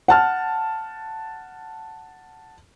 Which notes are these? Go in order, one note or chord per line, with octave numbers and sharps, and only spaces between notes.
F#5 A5 F6